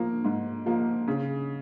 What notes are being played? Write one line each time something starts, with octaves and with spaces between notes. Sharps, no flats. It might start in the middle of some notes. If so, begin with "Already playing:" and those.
Already playing: F3 A#3
G#2
F3 A#3
C#3